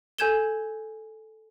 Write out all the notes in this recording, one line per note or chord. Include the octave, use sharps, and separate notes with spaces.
A4 G#5 G6 G#6 E7 G7